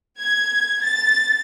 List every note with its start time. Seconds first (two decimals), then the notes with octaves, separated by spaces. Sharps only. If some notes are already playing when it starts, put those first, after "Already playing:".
0.19 G#6
0.84 A6